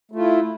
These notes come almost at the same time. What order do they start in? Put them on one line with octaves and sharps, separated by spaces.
A3 F4 E4